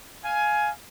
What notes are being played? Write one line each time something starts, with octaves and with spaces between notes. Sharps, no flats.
F5 G#5